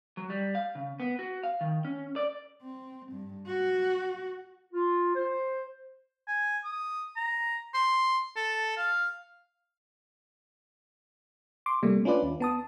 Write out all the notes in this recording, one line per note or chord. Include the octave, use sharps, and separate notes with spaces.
F#3
G3
F5
C#3
B3
F#4
F5
D#3
C#4
D5
C4
G2
F#4
F4
C5
G#5
D#6
A#5
C6
A4
F5
C6 D6
C3 G3 A3 A#3
C#4 D4 F4 B4 D5
D#2
B3 A5 D#6